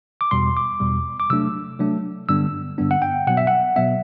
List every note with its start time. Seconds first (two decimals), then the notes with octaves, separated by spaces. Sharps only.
0.21 D6
0.31 E2 B2 G3 C6
0.57 D6
0.80 E2 B2 G3
1.20 D6
1.30 C3 F#3 A3 D4 E6
1.79 C3 F#3 A3 D4
2.29 G2 D3 G3 B3 D4 E6
2.78 G2 D3 G3 B3 D4
2.91 F#5
3.02 G5
3.27 B2 F#3 B3 F#5
3.37 E5
3.47 F#5
3.76 B2 F#3 B3 E5